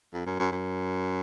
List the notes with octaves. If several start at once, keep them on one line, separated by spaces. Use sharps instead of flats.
F2
F#2
F#2
F#2